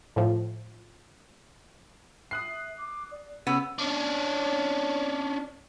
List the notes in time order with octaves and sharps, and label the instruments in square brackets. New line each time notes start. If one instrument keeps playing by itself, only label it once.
[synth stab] A2 F3
[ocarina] E5 [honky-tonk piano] D#6 F#6 C7
[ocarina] D6
D5
[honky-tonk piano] C#3 C#4 [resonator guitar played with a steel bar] B3 [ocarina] E6
[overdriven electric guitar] C#4 D4